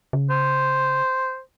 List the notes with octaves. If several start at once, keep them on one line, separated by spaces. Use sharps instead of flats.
C#3
C5